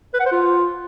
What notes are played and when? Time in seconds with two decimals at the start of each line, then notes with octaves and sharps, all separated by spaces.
0.14 B4
0.20 F#5
0.26 C5
0.32 F4